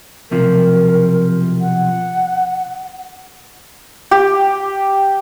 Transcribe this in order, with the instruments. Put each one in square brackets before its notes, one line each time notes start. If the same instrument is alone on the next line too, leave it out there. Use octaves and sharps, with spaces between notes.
[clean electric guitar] B1 C3 F3 [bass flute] A#4
[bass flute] F#5
[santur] G4